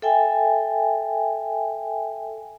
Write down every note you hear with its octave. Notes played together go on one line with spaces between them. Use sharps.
A4 E5 G5 G#5